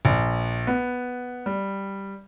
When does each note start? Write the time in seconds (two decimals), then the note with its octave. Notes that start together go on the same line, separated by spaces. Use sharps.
0.05 A#1
0.67 B3
1.46 G3